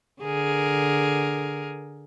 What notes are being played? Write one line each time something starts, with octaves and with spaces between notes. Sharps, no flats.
D3 G#4 A#4